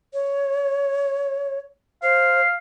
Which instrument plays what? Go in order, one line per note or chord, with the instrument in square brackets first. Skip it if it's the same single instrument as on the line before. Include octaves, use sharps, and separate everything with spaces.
[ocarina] C#5
[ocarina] C5 [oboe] F5